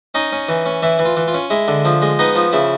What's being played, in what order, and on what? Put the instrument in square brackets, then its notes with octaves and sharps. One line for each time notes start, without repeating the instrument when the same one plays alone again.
[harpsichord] C#4 D#4
C#4
E3
C#4
E3 E4
E3
F4
E3
F4
C#4
G#3 E4
D3
F3
G#3
B3 D#4
F3
C#3 E4